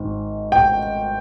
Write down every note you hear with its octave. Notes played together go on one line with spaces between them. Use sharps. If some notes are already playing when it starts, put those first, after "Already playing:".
Already playing: G#1 G#2
G5